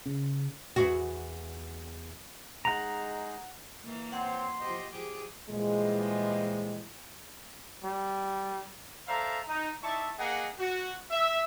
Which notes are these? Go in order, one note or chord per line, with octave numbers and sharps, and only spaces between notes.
C#3
E2 F#4
G#3 D#4 G#4 F#5 A#5
E3 A#3
C4 C5 C#5 F#5 C6
F3 G4 C5 D#5
F3 G4 G#4 D6
A#2 E3 F3 G3 G#3
G3
A4 C5 D5 E5 F5 A#5
D#4
D#4 E4 D5 E5 A5 C#6
A#3 G#4 D#5 F#5
F#4
E5